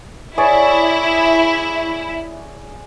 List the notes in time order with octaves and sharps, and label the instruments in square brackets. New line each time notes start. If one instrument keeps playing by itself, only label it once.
[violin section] E4 [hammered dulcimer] G#4 C#5 D5